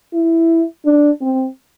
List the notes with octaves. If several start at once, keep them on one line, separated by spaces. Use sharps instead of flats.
E4
D4
C4